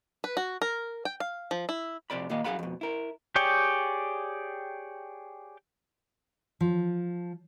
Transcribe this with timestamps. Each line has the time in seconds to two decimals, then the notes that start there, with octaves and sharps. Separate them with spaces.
0.24 B4
0.37 F#4
0.62 A#4
1.05 G5
1.20 F5
1.51 F3
1.69 E4
2.10 F2 C3 D5 B5
2.30 A#2 D#3 A#3 D#5 F5
2.44 F#2 C3 G#4 F5 F#5 B5
2.59 F2 B2
2.81 E4 A#4
3.36 G4 G#4 C#5 D5 G5
6.61 F3